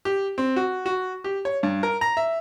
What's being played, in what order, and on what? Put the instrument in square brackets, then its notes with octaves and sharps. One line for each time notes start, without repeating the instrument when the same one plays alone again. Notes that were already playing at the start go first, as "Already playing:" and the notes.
[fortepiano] G4
C4
F#4
F#4
G4
C#5
G2
A#4
A#5
E5